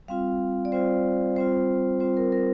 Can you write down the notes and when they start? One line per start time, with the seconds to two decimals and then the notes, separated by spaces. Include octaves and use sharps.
0.08 G3 C4 F4 F5
0.65 D5
0.72 G3 C4 F4 C5
1.36 G3 C4 F4 C5
2.00 G3 C4 F4 C5
2.17 A#4
2.32 A#4